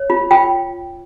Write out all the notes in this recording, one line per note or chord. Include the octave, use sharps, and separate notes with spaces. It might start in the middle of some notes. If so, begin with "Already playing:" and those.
Already playing: C#5
F4
F4 G5